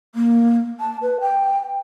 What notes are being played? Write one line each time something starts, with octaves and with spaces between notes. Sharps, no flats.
A#3
A5
B4
G5